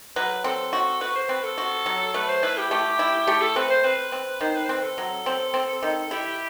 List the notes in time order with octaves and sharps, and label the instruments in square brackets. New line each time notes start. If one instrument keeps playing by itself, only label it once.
[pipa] F#3 [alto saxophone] B4
[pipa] C4 [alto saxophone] A4
[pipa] F#4
[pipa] F#4 [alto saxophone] B4
[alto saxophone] C5
[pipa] C4 [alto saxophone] B4
[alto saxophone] A4
[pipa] F#4
F#3
[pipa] A3 [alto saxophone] B4
[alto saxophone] C5
[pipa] E4 [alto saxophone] B4
[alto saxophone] G4
[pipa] A3 [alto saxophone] G4
[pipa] E4
[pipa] A3 [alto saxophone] G4
[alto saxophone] A4
[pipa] C4 [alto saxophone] B4
[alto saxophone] C5
[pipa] C4 [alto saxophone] B4
[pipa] C4
[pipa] D#3 [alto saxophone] C5
[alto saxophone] B4
C5
[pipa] C4 [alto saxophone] B4
[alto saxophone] A4
[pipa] F#3
C4
C4
D#3
[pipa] E4 [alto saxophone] G4